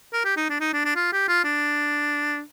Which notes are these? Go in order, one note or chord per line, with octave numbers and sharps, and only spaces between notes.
A#4
G4
D#4
D4
D#4
D4
D4
F4
G4
F4
D4